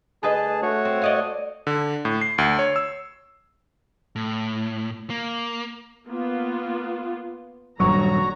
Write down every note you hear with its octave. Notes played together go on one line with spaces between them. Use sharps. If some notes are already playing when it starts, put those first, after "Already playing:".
D2 G#4 B4 D#5 A5
A3 F#4 C#5
C4
D5 D#5 F5
D3
A2
C7
D2
C#5
E6
A2
A#3
A#3 B3 F4
D#1 G2 F#3 F#4 C#5 A#5